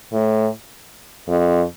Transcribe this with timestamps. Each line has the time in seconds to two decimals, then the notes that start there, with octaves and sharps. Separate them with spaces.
0.12 A2
1.28 F2